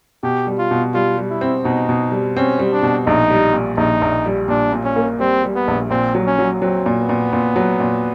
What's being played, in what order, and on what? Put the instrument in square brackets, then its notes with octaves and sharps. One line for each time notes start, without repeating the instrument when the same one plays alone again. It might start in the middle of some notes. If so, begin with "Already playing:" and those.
[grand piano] B2 [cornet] G4
[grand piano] G3
[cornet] F4
[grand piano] B2
[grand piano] G3 [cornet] F4
[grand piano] G3
[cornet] E4
[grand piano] C4
[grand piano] B2 [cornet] D#4
[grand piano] B2
G3
[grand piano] C4 [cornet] C#4
[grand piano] G3
[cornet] D4
[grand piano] B2
[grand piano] A#1 [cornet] D#4
[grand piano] G3
A#2
[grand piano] A#1 [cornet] D#4
[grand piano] A#1
G3
[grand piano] A#2 [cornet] D4
[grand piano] A#2
[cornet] C#4
[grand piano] A#3
[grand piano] G3 [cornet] C4
[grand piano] G3
[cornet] B3
[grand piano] A#1
[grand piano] A#2 [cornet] C4
[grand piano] F#3
[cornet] C#4
[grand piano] F#3
[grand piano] F#3 [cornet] C4
[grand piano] A#2
[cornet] B3
[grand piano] A#2
A#2
F#3
A#2